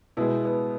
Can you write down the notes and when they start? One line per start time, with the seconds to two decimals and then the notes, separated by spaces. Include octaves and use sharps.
0.17 B2 G#3 B3 E4
0.45 B3